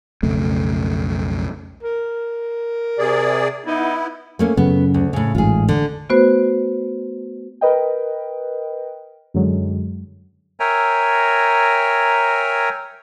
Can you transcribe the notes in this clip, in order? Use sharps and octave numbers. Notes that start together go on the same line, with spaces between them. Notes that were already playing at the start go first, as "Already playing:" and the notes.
B1 F2 C#3 A3
A#4
C3 G#4 D5
B3 D#4 E4
A3 A#3 C#4
F#2 C#3 B3
D2
A2 C#3
A1 G#2 F4 G#4
D3
A3 B3 F#4 B4 C5
A#4 B4 D#5 G5
F#2 D3 F#3 G#3
A#4 C#5 E5 G5 G#5 A#5